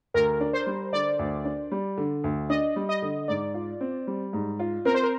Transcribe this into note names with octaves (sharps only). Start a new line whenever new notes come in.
D2 A#4
D4
C5
G3
D3 D5
D2
D4
G3
D3
D2
D4 D#5
G3
D#5
D3
G#2 D5
F4
C4
G3
G#2
F4
C4 A#4
C5
A#4